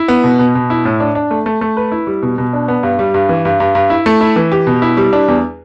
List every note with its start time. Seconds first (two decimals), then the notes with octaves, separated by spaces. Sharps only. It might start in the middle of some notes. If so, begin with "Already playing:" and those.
Already playing: E4
0.08 B3
0.24 B2
0.39 B2
0.55 B2
0.70 E4
0.85 A2
1.00 D4
1.15 D4
1.31 A3
1.46 A3
1.61 A3
1.77 B4
1.92 E4
2.07 G3
2.22 B2
2.38 B2
2.53 D4
2.68 B3
2.83 G2
2.99 G3
3.14 G2
3.29 E3
3.45 G2
3.60 G2
3.75 G2
3.90 E4
4.06 A3
4.21 E4
4.36 E3
4.52 G4
4.67 B2
4.82 E4
4.97 G3
5.13 D4
5.28 E2